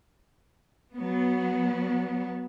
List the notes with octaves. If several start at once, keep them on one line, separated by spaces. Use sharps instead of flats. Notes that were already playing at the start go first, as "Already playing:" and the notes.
F#3 B3